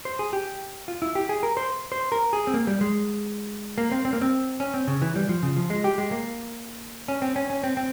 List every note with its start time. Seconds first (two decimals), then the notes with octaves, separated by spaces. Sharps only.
0.05 C5
0.19 G#4
0.33 G4
0.88 F4
1.02 E4
1.15 G4
1.29 G#4
1.43 A#4
1.57 C5
1.92 C5
2.12 A#4
2.33 G#4
2.47 C4
2.54 A#3
2.67 G3
2.81 G#3
3.78 A#3
3.91 C4
4.05 C4
4.13 A#3
4.21 C4
4.60 C#4
4.74 C4
4.88 C#3
5.02 E3
5.16 G3
5.29 F3
5.43 C#3
5.56 F3
5.70 G#3
5.84 G4
5.98 G#3
6.12 A#3
7.08 C#4
7.22 C4
7.36 C#4
7.50 C#4
7.64 C4
7.77 C4